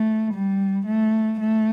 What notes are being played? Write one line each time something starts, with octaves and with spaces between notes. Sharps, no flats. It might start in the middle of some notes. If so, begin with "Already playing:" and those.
Already playing: A3
G3
A3
A3